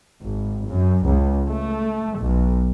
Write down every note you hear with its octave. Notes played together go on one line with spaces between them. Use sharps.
G#1
F#2
C#2
A3
B1